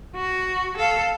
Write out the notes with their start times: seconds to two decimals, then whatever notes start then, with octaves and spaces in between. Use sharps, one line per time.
0.16 F#4
0.77 A4 F5